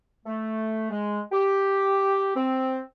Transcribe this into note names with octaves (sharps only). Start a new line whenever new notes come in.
A3
G#3
G4
C4